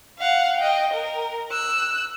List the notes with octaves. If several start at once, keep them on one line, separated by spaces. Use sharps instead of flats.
F5 F#5
D#5 G5
A#4
E6 F#6